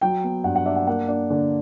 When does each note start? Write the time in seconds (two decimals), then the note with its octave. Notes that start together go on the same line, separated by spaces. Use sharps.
0.01 F#3 G5
0.24 B3
0.44 G2 F#5
0.56 F#5
0.66 D4 E5
0.76 F#5
0.87 A#3 F#5
1.08 D4
1.30 D3